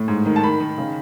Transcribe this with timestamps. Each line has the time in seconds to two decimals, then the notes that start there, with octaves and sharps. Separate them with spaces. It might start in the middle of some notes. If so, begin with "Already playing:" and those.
Already playing: A2
0.08 G#2
0.26 D#3
0.36 A5
0.43 D#3 B5
0.60 D#3
0.78 C#3